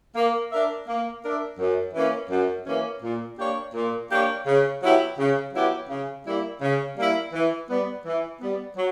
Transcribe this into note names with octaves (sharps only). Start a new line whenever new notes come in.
A#3
D4 A#4 E5
A#3
D4 A#4 E5
F#2
E3 A#3 C#4
F#2
E3 A#3 C#4
A#2
A#3 D4 G4 C#5
A#2
A#3 D4 G4 C#5
C#3
F#3 B3 E4 G4
C#3
F#3 B3 E4 G4
C#3
G3 A#3 E4
C#3
G3 A#3 E4
E3
G3 B3
E3
G3 B3
F#3